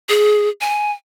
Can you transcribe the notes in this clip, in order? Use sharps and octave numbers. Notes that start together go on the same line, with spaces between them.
G#4
G#5